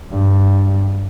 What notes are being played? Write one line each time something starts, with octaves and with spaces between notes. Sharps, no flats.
G2